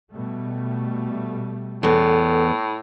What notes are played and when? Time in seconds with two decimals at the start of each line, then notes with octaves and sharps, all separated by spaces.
0.13 B2 G3 A3
1.83 E2 A2 B3 A4